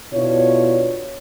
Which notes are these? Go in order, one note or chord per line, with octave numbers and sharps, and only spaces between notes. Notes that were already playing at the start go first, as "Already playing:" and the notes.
B2 D4 E4 F4 C#5